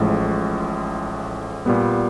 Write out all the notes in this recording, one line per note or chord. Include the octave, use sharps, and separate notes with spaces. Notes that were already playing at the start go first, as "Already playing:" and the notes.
Already playing: A1 A2 F3 G#3
A#2 G3 B3